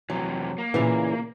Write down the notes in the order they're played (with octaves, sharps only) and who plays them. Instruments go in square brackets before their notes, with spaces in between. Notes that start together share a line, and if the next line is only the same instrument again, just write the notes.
[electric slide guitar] F2 C3 E3 [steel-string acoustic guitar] F#3
[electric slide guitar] A#3
[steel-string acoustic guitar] A#2 C#3 E3